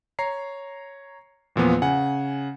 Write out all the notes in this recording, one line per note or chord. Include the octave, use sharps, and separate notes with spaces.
C#5 A#5 C7
E2 A#2 F3 B3
C#3 F#5 G#5